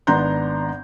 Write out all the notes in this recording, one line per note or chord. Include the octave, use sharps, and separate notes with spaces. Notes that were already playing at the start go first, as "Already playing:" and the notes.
G#1 B3 D4 A#5 C6 G6